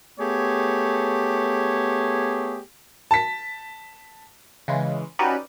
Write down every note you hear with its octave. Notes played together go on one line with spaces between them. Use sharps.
A3 B3 G4 G#4 C#5
A5 B6
C#3 E3 G#3
C#4 D#4 F#4 G4 B4 D5